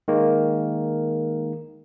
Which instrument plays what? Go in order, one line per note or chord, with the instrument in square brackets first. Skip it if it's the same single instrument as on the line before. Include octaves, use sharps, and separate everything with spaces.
[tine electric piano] D#3 G#3 A#3